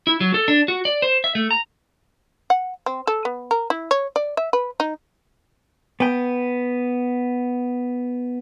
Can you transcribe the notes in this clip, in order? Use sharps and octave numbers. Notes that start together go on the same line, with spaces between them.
E4
F#3
A4
D4
F#4
D5
C5
E5
A3
A#5
F#5
C4
A4
B3
A#4
E4
C#5
D5
E5
B4
D#4
B3 G5